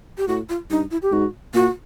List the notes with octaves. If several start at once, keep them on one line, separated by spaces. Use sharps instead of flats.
G4
A2 F#4
F4
G2 D#4
E4
G4
G#2 F#4
A#2 F#4